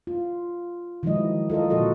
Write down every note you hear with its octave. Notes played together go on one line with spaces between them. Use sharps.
F4
D#3 F3 F#3 G#3 E4 D#5
F4 A4 A#4 D#5
A#2 D3 F3 F#4 A4 D#5